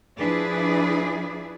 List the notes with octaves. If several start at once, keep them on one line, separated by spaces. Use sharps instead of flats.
F3 D4 E4 G#4 B4 D5